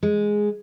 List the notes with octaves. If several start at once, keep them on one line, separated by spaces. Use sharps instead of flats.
G#3